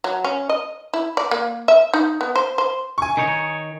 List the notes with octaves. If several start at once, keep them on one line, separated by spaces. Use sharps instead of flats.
F#3
C#4
D#5
E4
D5
A#3
E5
D#4
B3
C5
C5
G#5 C#6
D#3 D#4 C#5